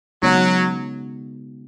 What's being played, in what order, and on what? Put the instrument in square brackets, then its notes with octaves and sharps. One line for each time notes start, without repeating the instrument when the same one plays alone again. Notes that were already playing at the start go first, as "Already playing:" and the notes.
[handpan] C#3 G#3 B3 D#4 F#4 [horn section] F#3